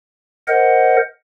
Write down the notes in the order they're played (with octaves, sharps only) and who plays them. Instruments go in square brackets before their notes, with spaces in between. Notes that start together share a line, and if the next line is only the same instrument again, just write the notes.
[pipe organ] A#4 C5 D#5 F#5